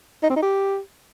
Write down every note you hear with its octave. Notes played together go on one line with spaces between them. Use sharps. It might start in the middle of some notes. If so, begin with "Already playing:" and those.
D#4
C4
D#4
G4